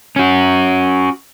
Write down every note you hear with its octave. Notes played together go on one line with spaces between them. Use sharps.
C#4 F#4